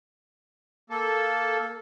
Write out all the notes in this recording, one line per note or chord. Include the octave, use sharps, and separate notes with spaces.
A#3 A4